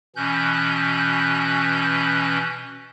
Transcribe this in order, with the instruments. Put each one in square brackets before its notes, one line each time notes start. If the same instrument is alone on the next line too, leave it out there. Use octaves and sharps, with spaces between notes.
[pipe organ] B2 E3 C#4 F#6 G6